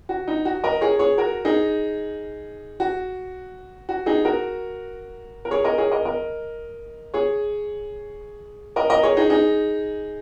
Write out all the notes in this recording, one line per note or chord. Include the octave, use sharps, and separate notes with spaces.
F#4
D#4
F#4
A#4 D#5
G#4 C#5
G#4 C#5
F#4 A#4
D#4 G#4
F#4
F#4
D#4 G#4
F#4 A#4
A#4
G#4 C#5
A#4 D#5
G#4 C#5
A#4 D#5
A#4 D#5
G#4 C#5
A#4 D#5
A#4 D#5
G#4 C#5
D#4 G#4
D#4 G#4